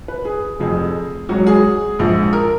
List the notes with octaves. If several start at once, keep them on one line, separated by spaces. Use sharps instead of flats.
B4
G#4
F1 F2 F3 G#4
G#1 G#2 F#3 F#4
G#4
A#1 G#2 F3
A#4